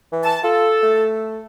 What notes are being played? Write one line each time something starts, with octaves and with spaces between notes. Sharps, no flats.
E3
A5
F4 A4
A3